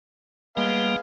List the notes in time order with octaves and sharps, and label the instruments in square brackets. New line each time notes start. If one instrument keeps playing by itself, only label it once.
[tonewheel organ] G3 A#3 [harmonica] G#3 B3 F5